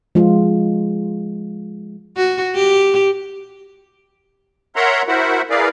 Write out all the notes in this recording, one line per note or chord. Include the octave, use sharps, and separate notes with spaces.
F3 G#3 F4
F#4
G4
A#4 C#5 E5 F#5 A#5 C6
E4 F#4 A#4 C5 E5 F#5
E4 G#4 A#4 B4 D5 F5